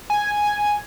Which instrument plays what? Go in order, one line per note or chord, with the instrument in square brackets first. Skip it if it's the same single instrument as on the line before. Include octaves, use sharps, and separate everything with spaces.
[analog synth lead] G#5